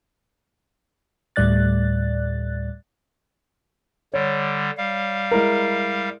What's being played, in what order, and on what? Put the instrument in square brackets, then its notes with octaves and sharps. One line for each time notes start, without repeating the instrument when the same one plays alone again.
[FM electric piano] D2 A2 G3 D5 F#6 A6
[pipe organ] D3 G3 [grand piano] C#5
[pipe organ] G3 F5
[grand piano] G#3 E4 A#4